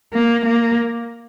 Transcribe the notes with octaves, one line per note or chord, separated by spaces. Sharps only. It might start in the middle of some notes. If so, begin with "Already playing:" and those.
A#3
A#3